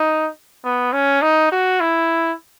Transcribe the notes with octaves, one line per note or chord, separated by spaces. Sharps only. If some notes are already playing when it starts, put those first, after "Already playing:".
Already playing: D#4
B3
C#4
D#4
F#4
E4